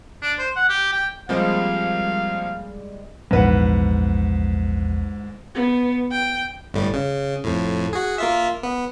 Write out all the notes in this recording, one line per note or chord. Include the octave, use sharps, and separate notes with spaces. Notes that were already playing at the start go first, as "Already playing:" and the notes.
D4
C5
F#5
G4
G5
F3 G3 G#3 A#3 C4 F5
A#1 E2 G#2 B4 F#5
B3
G5
G1 A2 G3
C#3
F2 A2
F#4 G#4
A#3 F4 E5
B3